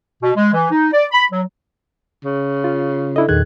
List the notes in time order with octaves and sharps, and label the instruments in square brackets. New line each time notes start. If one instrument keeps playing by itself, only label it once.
[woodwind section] B2
G#3
E3
D#4
D5
B5
F#3
[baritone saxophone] C#3
[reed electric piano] F4
[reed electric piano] D4 E4 D#5 [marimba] A4
[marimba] E2 A#2 G#4 [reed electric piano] D#3 F#6 G#6